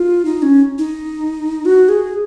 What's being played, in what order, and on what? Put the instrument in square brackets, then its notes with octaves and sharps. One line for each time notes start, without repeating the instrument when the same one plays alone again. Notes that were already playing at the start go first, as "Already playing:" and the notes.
Already playing: [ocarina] F4
D#4
C#4
D#4
F#4
G#4